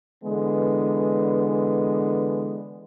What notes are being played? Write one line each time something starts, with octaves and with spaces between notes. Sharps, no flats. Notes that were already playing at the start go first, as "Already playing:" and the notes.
D3 E3 G#3 B3